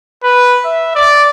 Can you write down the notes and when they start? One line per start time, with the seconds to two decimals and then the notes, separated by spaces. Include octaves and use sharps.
0.23 B4
0.65 E5
0.95 D5